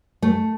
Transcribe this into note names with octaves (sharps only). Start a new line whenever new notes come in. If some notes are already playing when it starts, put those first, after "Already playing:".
A3